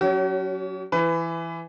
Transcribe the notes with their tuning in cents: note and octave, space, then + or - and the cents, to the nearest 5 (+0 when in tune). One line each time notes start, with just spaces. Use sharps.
F#3 +0 C#4 +20 F#4 +45
E3 +10 B4 +25